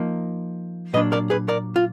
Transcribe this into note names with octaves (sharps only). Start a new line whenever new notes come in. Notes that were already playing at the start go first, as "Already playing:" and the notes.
Already playing: F3 A#3 D#4
A#2 F#3 A#3 D4 B4 D#5
A#4 D5
G#4 B4
A#4 D5
F4